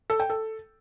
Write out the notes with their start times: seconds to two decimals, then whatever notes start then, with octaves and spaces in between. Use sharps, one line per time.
0.10 A4
0.20 G5
0.30 A4